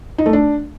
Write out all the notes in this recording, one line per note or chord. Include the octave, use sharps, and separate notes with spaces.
D#4
A3
D4